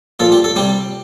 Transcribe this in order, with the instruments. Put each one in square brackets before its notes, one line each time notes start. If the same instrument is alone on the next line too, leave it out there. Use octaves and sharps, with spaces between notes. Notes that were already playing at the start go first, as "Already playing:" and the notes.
[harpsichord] A#2 F3 A4
G4
A4
C3 G3 G4